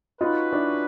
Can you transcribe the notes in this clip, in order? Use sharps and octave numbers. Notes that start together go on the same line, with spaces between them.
C#4 D#4 F4 F#4 B4
D4 E4